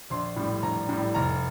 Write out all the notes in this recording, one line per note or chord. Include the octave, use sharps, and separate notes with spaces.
A#1 C6
A2 G3
A#1 A#5
A2 G3
F1 A#5